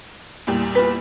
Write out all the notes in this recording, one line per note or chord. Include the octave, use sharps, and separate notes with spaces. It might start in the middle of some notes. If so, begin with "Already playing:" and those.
E2 A#2 G3
F4 B4